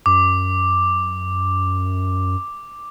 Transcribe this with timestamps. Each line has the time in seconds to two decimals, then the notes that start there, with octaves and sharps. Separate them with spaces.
0.06 F#2 D6